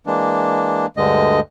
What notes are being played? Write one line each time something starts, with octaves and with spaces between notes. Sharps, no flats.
E3 G#3 A#3 D4
D2 G2 D3 G#3 D#5